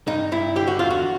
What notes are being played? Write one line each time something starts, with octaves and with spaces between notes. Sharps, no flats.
G2 D#4
G2 E4
D3 G4
F#4
E2 F4
F#4